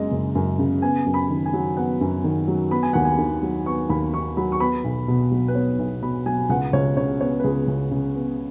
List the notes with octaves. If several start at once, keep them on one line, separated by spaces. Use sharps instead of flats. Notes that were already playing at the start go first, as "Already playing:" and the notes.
Already playing: F#1 F#2 C#3 G#3 D#5
F#1
F#2
C#3
B3 G#5
F#2
B5
D#3
G#5
F#3
B3 F#5
F#2
D#3
F#3
B3 B5
G#5
D#2 F#5
G#5
D#3
F#3
B3 C#6
D#2 B5
D#3 C#6
F#3 B5
C#6
B3 B5
B1
B2
F#3
B4
B3 C#5
B1
B2 B5
F#3 G#5
C#2 F#5
C#2 C#5
C#3 C#5
B3 C#5
B4
C#2 G#4
C#2
C#3
B3